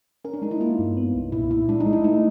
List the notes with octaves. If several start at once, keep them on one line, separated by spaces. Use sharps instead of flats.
C#4 A#4
D4
G#3 D#4
E4
A#3 F4
G2
B3
C2
A#2 E4
A#2 E4
G#3 D4
D#4
G#3
E4
A3 D#4